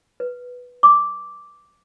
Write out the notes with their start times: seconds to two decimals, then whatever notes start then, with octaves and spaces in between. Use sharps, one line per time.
0.20 B4
0.83 D6